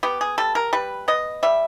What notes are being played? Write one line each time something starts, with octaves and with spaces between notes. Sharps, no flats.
B3 G4
G#4
G3 A4
A#4
G3 B4
B3 D#5
G3 E5